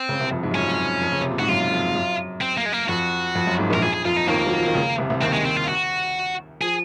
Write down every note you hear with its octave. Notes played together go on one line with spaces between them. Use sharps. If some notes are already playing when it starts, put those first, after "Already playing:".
Already playing: C4
C#2 C#3
C2 C3
F2 F3
G#2
F#2
F2 C#4
F#2
F2
C#3
C3
A#2
G#2 F#4
F#2 F4
F2
F#2
C4
A#3
G#3
A#3
F2 F#4
F2
F#2
G#1 G#2
A#1 A#2
A#4
F2 F3 G#4
G#4
F2 F3 F4
D#4
D#2 D#3 A#3
F#3
F3
D#3
C#2 C#3
C2 C3
C2 C3
D#2 D#3 C4
G#3
C4
F4
F#4
F3 G#4